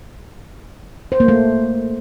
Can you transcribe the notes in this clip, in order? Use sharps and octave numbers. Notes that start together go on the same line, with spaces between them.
C5
A#3
A3